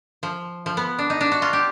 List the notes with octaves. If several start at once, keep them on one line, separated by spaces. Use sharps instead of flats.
F3
F3
B3
D4
D#4
D4
F#4
F4
G4